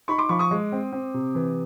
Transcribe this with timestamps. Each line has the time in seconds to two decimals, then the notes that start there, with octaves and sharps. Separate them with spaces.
0.08 D#4 B5 C#6
0.18 C6 D6
0.29 F3 B5 C#6
0.39 C#6 D#6
0.51 G#3
0.72 C4
0.92 C4
1.14 C3
1.35 E3